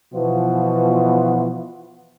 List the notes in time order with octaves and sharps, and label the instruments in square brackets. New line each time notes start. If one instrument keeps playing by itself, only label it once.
[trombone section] B2 E3 F3 B3 F4 F#4